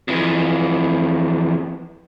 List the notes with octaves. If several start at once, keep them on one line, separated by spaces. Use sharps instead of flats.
F2 E3